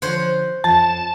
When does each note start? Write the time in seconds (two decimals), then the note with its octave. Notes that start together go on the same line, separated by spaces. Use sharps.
0.02 D3 F3 C5 C#5 F#5
0.64 F2 F3 A5